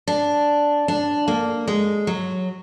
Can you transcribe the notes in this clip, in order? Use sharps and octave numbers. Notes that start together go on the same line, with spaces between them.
D4
D4
A#3
G#3
F#3